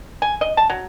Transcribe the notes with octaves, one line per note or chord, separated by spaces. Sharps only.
G#5
D#5
A5
F#3